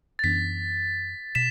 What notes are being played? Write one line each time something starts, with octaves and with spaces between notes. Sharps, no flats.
A6
F#2 E3 B3 D4 B6
B2 B6 E7